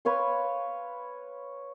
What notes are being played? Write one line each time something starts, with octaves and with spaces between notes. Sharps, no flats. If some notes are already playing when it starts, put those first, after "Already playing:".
B4 C#5 F5 C6